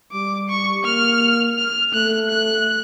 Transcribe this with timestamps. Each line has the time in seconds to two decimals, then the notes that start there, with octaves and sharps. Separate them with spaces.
0.12 G3 D6
0.49 C#6
0.85 A#3 F6
1.58 F6
1.94 A3 F#6
2.30 F#6